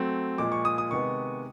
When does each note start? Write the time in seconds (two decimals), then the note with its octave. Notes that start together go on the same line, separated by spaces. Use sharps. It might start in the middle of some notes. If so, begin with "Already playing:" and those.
Already playing: F#3 A3 C4
0.38 A#2 F3 G#3 D6
0.52 C#6
0.65 D#6
0.78 D#6
0.91 C3 D#3 G#3 B3 C#6